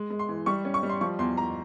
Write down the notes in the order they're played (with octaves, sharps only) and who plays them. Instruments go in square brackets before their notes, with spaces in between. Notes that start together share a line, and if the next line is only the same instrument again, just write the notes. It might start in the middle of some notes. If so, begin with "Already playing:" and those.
Already playing: [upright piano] G#3
G#3
C6
E3
G3 C#6
C#4
C#6
G3
C6
F3 C#6
E2 C6
E2 A#5